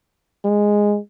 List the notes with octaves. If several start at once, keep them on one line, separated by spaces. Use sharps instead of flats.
G#3